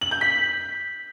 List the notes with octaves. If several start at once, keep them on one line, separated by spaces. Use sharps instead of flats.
F#7
G6
B6